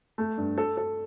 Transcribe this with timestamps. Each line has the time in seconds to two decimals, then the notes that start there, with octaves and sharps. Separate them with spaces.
0.18 A3
0.38 G2
0.58 A4
0.77 A4